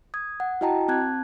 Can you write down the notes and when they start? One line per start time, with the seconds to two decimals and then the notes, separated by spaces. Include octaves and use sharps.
0.14 D#6 G#6
0.40 F#5
0.61 E4 F#4 D#5 G5 A5 A#5
0.88 C4 A5 F#6 G#6